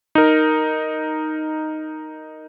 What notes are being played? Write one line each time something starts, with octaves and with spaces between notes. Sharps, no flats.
D#4 A#4